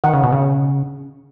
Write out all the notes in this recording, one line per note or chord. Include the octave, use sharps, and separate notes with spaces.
D#3 F#5
C#3
B2
C#3